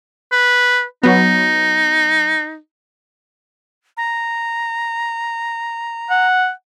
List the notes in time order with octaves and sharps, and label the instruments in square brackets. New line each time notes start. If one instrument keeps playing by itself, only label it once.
[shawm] B4
[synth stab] F#3 B3 [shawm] D#4
[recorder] A#5
[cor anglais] F#5